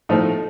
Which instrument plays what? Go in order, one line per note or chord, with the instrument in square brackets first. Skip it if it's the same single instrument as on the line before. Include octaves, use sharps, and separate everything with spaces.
[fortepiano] A2 F3 A3 D#4